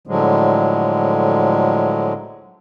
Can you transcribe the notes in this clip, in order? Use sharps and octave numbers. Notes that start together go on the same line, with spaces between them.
A2 D3 F3 F#3 G#3